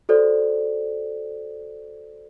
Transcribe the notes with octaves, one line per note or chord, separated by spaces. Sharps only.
F#4 A4 C5 D5